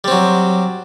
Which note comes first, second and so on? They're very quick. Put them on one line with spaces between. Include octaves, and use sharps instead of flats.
G3 C4 F#3